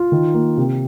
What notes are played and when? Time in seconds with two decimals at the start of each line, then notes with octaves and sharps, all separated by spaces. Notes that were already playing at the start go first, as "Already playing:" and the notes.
Already playing: F4
0.12 D#3
0.34 A#3
0.57 C3